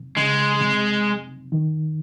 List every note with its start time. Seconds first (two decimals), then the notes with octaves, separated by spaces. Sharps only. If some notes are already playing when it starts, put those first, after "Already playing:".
Already playing: C3
0.17 C#3 G#3
0.61 C3
1.52 D#3